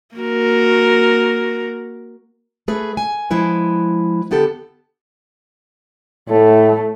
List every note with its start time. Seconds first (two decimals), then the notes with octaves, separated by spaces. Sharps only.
0.16 A#3 F#4 A#4
2.68 A3 G#4 B4
2.97 G#5
3.31 F3 G#3 E4 B4
4.31 D3 B3 G4 A4
6.29 A2 A3